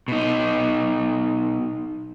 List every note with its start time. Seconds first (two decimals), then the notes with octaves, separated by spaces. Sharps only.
0.08 B2 D#4